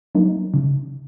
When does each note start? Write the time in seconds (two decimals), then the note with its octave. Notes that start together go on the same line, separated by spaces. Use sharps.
0.15 F#3 A#3 D#4
0.54 C#3